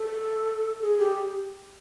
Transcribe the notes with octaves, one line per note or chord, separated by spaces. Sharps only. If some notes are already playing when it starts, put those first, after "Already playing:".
Already playing: A4
G#4
G4